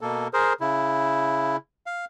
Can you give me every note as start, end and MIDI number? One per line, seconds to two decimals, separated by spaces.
0.01 0.28 47
0.01 0.28 58
0.01 0.28 69
0.33 0.53 68
0.33 0.53 70
0.33 0.53 72
0.61 1.57 49
0.61 1.57 64
1.86 2.05 77